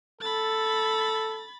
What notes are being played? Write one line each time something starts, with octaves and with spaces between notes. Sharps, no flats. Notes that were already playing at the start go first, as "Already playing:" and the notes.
A4 B5 A6